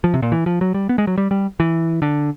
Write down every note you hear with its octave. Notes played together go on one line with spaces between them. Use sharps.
F3
C3
A#2
E3
F3
F#3
G3
B3
G#3
F#3
G3
G3
E3
D3